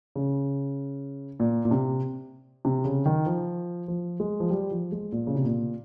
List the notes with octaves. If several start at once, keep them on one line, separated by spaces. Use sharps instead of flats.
C#3
A#2
A#2
C3
C3
C#3
D#3
F3
F3
G#3
F3
G3
F3
G#3
A#2
C#3
C3
A#2